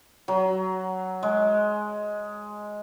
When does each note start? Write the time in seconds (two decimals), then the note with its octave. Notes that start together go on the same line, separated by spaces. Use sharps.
0.28 F#3
1.23 G#3